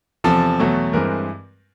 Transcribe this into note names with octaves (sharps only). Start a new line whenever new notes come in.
E2 C3 F3 A4
E2 B2 F#3 A3
G2 E3 G#3 C4 A#4